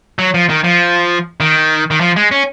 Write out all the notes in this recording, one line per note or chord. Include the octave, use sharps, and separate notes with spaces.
F#3
F3
D#3
F3
D#3
D#3
F3
G#3
C#4